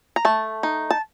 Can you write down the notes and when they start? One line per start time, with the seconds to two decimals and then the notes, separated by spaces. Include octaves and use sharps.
0.16 A#5
0.25 A3 A5
0.63 D#4
0.91 A5